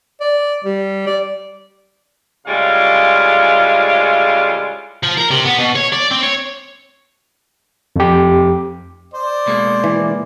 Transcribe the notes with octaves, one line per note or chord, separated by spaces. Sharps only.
D5
G3
D5
A2 C#3 G3 G#3 F4 F5
F3
A#4
C3
B3
B2
C#5
D5
C4
C#5
F2 G4
C5 D5
B2 G#3 A#3
E3